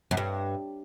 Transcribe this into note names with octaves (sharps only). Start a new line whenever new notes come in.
F#2
G2